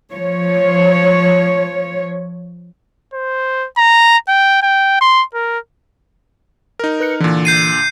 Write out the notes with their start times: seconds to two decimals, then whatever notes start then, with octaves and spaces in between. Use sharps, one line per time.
0.13 F3 C#5
3.14 C5
3.77 A#5
4.28 G5
4.63 G5
5.01 C6
5.34 A#4
6.79 D#4 A#4
7.00 B4 F#6 C#7
7.20 A#2 D3 E3
7.45 G6 C7 D#7